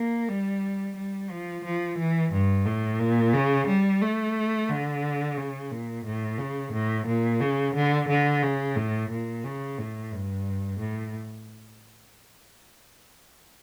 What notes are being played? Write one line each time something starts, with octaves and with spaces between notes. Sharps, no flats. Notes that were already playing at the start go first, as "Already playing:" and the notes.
Already playing: A#3
G3
G3
F3
F3
E3
G2
A2
A#2
C#3
G3
A3
D3
C#3
A#2
A2
C#3
A2
A#2
C#3
D3
D3
C#3
A2
A#2
C#3
A2
G2
A2